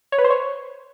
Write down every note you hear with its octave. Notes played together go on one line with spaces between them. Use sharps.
C#5
B4
C5
C#5